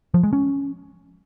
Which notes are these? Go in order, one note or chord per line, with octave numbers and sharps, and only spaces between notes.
F3
G#3
C#4